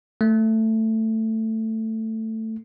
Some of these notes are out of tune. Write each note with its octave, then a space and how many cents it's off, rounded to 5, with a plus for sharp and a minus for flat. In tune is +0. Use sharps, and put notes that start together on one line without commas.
A3 +10